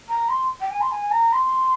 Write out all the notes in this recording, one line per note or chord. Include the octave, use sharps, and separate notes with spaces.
A#5
C6
G5
G#5
C6
G#5
A#5
C6